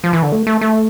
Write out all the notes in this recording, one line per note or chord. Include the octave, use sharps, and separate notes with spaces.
F3
E3
D3
A3
A3
A3